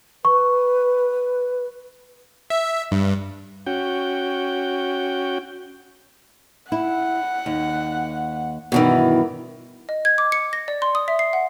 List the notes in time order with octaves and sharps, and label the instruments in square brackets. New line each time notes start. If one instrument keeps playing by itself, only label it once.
[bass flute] B4 [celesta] C#6
[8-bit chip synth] E5
G2
[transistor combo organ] C#4 F#4 G5
[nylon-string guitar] E4 [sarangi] F#5
[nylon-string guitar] D#2
[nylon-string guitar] G2 D#4 [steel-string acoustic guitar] B2 D#3 E3
[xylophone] D#5
G#6
D6
C#7
A#6
D5
C6
D#6
E5
C7
F#5